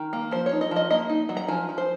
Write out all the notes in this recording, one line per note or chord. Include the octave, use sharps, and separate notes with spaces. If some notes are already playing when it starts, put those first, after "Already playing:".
Already playing: D#3
A#3
F3 C5
C#5
D#4
D#5
F3
D#5
A#3 D#5
D#4
F#3
A#5
F3 G#5
F3
C5